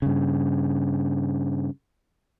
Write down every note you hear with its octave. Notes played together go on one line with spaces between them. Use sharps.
G2 C#3